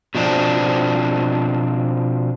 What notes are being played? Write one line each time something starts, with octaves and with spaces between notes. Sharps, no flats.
B2 F3 C4 D4